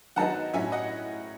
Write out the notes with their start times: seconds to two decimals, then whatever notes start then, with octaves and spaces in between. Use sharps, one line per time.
0.16 D#3 F#3 B3 D#4 F#5 A5
0.54 A2 F#3 C#4 E4 E5 G#5
0.72 D#5 F#5